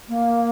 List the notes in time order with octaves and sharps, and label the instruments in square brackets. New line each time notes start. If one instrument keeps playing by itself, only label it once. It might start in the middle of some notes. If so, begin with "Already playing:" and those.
[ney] A#3